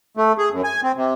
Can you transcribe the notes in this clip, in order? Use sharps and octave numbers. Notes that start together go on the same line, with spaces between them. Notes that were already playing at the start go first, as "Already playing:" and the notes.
A3
G#4
F#2
G#5
C4
C3